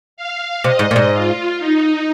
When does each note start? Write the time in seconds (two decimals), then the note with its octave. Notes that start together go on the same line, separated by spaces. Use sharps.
0.17 F5
0.64 C3 D#5
0.79 G#2
0.91 A#2
0.96 G#2
1.11 F4
1.59 D#4